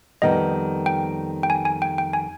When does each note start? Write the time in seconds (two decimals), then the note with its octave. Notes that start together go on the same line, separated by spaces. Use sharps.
0.22 F2 D#3 G3 B3 D#5
0.86 G5
1.43 G5
1.50 G#5
1.65 G#5
1.82 G5
1.98 G5
2.13 G#5